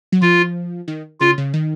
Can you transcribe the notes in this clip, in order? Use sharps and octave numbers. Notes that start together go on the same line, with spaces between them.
F#3
F3 F4
D#3
C#3 F4
C#3
D#3